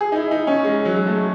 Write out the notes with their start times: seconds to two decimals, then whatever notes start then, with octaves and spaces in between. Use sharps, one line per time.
0.01 G#4
0.12 D#4
0.16 E4
0.31 D#4
0.47 C#4
0.64 G#3
0.85 F#3
0.97 G#3
1.07 A3